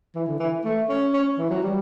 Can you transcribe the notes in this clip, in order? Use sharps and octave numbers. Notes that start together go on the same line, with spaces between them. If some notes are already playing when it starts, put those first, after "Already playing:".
E3
D3
E3
A3
C#4
C#4
E3
F#3
G3